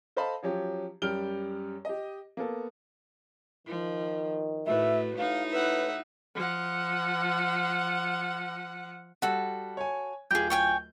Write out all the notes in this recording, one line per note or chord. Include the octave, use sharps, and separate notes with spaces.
A4 C5 D#5 F5 A5 B5
F3 F#3 C#4 G4
F#2 G3 G4 F6 D7 G7
G4 D#5
A#3 B3 A4
D#3 F3
A2 A3 F#4 B4 E5
A2 D#4 E4 F5
B4 E5 F#5
F3 F#5
G3 F#4 A4 F#5
C#5 G#5
D1 F4 G4 G#4 G6
C#5 G5 G#5